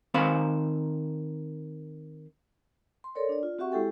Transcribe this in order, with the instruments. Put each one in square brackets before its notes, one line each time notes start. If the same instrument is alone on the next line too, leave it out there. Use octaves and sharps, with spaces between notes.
[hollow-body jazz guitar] D#3 C4 C5 F5 B5
[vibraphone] C6
A4 A#4 C#5 D5
D4 D5
F4
C4 F#4 G4 E5 F#5 C#6
G#3 E4 G4 A4 G5